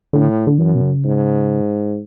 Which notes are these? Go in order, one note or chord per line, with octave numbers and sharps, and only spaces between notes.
A2 D3
D3
F#2 E3
B2
C#3
G#2